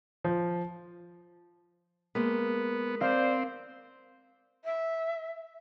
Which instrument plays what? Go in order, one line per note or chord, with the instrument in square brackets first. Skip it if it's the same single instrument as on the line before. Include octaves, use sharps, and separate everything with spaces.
[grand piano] F3
[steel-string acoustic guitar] G#3 A#3 [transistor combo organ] B3
[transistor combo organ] C4 [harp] A#4 F5 [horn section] C5 D5
[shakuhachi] E5